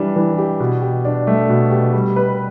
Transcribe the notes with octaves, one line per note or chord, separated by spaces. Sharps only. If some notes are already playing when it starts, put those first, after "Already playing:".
Already playing: E3 G3 D4 G4
E3
G4
B2
G4
D4
A3
B2
G4
G3
B4